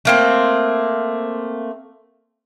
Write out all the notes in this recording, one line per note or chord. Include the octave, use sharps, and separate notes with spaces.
A3 A#3 C4